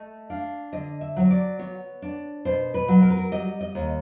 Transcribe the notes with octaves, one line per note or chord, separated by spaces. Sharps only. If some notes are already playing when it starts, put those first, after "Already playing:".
Already playing: A3 D#5
D4 F5
D3 D#5
E5
F#3 C#5
D5
B3 C#5
D4
B2 C5
B4
F#3
A#4
B4
A#4
G3 D#5
D#5
D#2